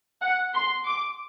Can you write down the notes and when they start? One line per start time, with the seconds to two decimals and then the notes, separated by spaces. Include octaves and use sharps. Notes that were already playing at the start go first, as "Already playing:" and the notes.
0.21 F#5
0.54 C6
0.86 D6